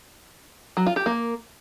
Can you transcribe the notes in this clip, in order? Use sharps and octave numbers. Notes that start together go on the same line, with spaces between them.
F#3
F4
G4
A#3